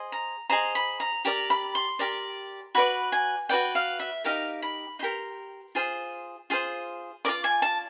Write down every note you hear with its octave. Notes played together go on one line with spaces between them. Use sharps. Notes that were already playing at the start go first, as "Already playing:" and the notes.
Already playing: G#4 C5 D#5
A#5
G#4 C5 D#5 A#5
B5
A#5
G4 A#4 D5 A#5
B5
C6
G4 A#4 D5
F#4 B4 D5 B5
G#5
F#4 B4 D5 G5
F5
E5
D#4 G4 A#4 F5
B5
D#4 G4 A#4 C6
F4 G#4 C5
F4 G#4 C5
F4 A#4 D5 D6
G#5
A5